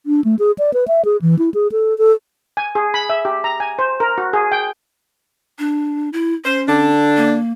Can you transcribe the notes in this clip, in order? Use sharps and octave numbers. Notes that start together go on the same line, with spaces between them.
D4
A3
G#4
D5
B4
E5
G#4
E3
E4
G#4
A4
A4
G#5
G#4
B5
E5
G4
A#5
G#5
C5
A#4
F#4
G#4
G5
D4
E4
C#4 C5
D3 D4
A#3